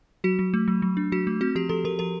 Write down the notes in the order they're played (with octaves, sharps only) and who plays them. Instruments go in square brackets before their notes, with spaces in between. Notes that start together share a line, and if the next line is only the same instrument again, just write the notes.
[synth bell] F#3 F#4
F#3
A3
F#3
F#3
D4
F#3 F#4
A3
C4 F#4
F3 G4
F3 A4
F3 A#4
F3 A#4